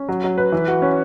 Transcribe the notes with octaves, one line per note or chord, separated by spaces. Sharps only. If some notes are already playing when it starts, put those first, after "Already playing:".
Already playing: C#4
F#3
F#3
B4
E3
F#4
C#4